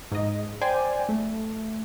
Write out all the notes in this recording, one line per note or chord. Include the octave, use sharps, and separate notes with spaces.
G#2 D#5
C5 D5 G5 G#5
A3